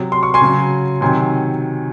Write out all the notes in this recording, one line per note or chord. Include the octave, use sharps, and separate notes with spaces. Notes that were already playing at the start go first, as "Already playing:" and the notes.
Already playing: C3 F#3
C6
C#6
G#5 C6
C#3 F#3
C3 D#3 F#3 G#5 C6